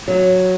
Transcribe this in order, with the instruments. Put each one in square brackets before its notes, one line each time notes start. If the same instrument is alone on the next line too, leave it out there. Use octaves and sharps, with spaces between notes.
[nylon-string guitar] F#3